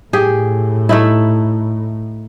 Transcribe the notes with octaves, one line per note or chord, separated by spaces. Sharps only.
A2 G4 G#4
A3 D#4 E4